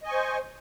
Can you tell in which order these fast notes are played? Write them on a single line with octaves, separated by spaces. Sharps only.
D#5 G#5 C#6 C5